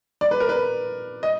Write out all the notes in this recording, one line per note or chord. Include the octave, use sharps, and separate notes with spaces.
D5
B4
A#4
B4
D#5